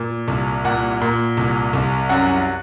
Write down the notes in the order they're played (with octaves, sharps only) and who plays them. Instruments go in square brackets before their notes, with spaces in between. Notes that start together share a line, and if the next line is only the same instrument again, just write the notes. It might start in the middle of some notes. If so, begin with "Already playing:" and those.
Already playing: [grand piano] A#2
C2
A#2 F#5
A#2
C2
C2
F#2 F#5